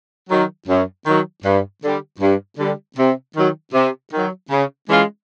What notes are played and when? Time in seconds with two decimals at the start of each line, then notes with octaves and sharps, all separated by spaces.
0.30 D#3 F#3
0.68 F#2
1.06 D#3 F#3
1.44 G2
1.82 D3 G3
2.20 G2
2.58 D3 G3
2.97 C3
3.35 D#3 F#3
3.74 C3
4.12 D#3 F#3
4.50 C#3
4.88 E3 G#3 C#4 F4